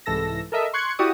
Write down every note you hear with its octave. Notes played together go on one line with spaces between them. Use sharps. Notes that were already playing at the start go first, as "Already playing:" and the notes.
C2 G#2 E3 A4 E6 A#6
A4 A#4 D#5 E5
C6 C#6 F#6 G#6 C#7
E4 F#4 G4 D5 C#6 D#6